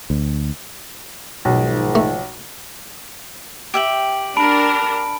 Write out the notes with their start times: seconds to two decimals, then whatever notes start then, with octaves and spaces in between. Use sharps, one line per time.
0.10 D2
1.45 B1 G#2 D#3 F3
1.95 A3
3.74 G4 E5 G5 D7 F#7
4.37 D4 A#4 A5 B5 D7